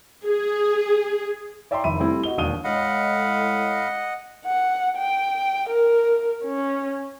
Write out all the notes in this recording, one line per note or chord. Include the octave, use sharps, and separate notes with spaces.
G#4
C#5 D5 E5 G5 A#5 C6
F1 D#3 E5 B5 D#7
G3 A3 C4 E4
F#4 D#5 G7
E1 D#2 D4 D#6 D#7 G7
A2 G#3 D#5 F5 F#5 B5
F#5
G5
A#4
C#4